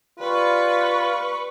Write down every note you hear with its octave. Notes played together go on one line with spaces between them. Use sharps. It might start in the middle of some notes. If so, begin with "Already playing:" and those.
G3 F4 B4 C#6